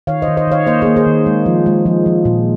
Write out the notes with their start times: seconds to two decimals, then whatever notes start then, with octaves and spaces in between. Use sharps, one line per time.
0.07 D#3 C#5 F5
0.22 C5 D#5
0.28 D#3
0.37 C5 D#5
0.47 D#3 C#5 F5
0.67 A#3 C5 D#5
0.82 A#3 G#4 C5
0.96 G#4 C5
1.06 D#3
1.26 G#3
1.46 F3
1.66 G#3
1.86 F3
2.06 F3
2.25 A#2